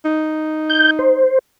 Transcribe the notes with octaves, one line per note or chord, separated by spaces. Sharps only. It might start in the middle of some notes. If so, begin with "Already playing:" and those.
D#4
G6
C5